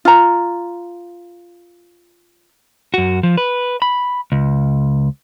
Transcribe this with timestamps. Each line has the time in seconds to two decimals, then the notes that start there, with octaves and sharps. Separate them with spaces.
0.05 F4 A#5
2.94 F#2 F#4
3.23 F3
3.37 B4
3.82 B5
4.32 C#2